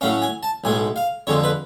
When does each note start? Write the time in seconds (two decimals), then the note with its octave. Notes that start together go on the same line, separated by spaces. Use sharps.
0.01 A2 F#3 C#4 F5
0.22 G#5
0.43 A5
0.64 B1 A2 G#3 G#5
0.96 F5
1.27 F2 D3 G#3 C#5
1.44 B4